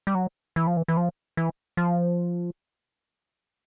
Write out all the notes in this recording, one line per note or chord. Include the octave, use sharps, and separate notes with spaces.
G3
F#3
E3
F3
E3
E3
F3
E3
F3